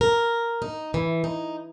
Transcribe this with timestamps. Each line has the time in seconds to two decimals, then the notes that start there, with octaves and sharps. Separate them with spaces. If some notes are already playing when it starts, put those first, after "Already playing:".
0.01 A#4
0.62 D#4
0.94 E3
1.24 D#4